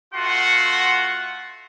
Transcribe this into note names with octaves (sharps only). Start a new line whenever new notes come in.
A3 F4 F#4 F#5 C6